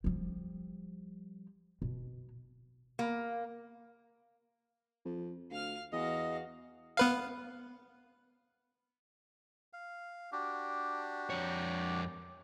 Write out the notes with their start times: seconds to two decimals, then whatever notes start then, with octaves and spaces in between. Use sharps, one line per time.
0.04 F3 G3
1.82 B2
2.99 A#3
5.05 F2
5.51 D2 F5 F6
5.92 E2 F#4 D#5 F5
6.97 B3 B4 F5
9.73 F5
10.32 D4 F#4 G4
11.30 F2 C#5